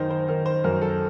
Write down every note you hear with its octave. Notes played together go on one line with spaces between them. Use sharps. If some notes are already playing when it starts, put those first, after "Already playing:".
Already playing: F#2 D#3 D#4 A#4 C5
C5
D#3 A#4
C5
F#2 A#4
A4